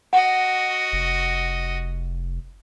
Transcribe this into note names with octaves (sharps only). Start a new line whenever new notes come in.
F#4 D#5 F#5
F1